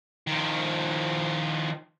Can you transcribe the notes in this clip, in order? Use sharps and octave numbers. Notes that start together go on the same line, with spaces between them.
D#3 F3